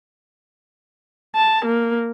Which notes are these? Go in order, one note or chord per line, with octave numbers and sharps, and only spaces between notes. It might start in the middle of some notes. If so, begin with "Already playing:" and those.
A5
A#3